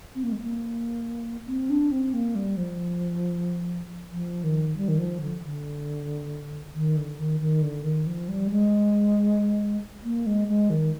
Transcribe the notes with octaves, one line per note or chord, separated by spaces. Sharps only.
C4
A#3
G#3
A#3
C4
D4
C4
A#3
G3
F3
F3
D#3
G3
D#3
F3
D3
D3
D#3
D3
D#3
D#3
D3
D#3
F3
G3
G#3
A#3
G#3
G#3
D#3